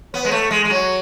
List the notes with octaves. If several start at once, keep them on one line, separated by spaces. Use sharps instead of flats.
B3 C#5
G#3 B4
A3 C#5
G#3
G#3
F#3 C#5